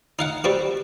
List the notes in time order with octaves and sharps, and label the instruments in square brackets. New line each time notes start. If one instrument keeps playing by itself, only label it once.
[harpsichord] D#4 F5 F#5
G3 C4 F#4